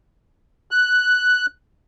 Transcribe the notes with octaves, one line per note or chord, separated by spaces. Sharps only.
F#6